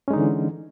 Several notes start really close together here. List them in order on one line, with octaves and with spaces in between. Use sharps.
C#4 G#3 D#4 D3 E3